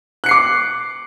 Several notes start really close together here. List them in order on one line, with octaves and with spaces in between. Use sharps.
F#6 C#7 C7 D6